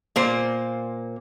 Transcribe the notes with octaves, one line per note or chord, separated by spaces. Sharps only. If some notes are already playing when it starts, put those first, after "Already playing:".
A#2 A#3 C5